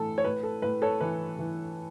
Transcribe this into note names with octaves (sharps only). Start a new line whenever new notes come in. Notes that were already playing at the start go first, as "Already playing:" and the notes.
Already playing: A2 E3 A4
C#5
A2 B4
A4
A2 B4
A4 C#5
E3 B4
E3